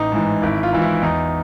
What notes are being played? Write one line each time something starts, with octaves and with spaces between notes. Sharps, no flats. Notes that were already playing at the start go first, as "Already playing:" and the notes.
Already playing: A1 D#4
G#2 E3
G#1 E4
F4
G#2 E3
E4
E2 D#4